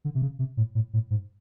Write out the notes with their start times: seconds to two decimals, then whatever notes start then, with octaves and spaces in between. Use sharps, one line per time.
0.05 D3
0.15 C3
0.22 C#3
0.39 C3
0.57 A2
0.75 A2
0.93 A2
1.10 G#2